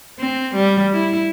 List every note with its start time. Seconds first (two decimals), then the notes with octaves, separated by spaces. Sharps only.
0.19 C4
0.56 G3
0.93 E4